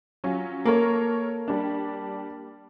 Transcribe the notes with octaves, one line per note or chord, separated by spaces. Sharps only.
F#3 C#4 F4
A#3 A4 A#4 C#5
G3 D4